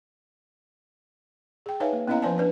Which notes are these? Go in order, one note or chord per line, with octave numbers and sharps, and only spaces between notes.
G#4 G5
D#4 B4 C#5 E5 F5 G#5
A#3
B3 C#4 E4 D#5 F5 A#5
F3 B4 C5 D5 G#5 A5
D4 B4 D5